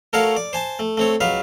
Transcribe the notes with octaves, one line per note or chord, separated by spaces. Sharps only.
A3 F#4 A4 A#4 C#5 F5
D5
C5 G#5 A5
A3
A3 C4 C#5
C#2 F#3 B4 F5